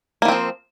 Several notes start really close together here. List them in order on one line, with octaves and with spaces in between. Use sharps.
A#3 E3 C4 F3